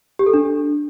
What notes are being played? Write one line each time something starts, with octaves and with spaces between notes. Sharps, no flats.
G4
A4
D4